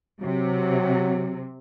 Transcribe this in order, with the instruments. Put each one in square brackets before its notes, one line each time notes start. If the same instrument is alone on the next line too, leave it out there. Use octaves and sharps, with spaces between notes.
[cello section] C3 [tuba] F#3